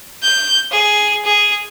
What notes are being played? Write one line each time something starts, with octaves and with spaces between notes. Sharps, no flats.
G6
G#4
G#4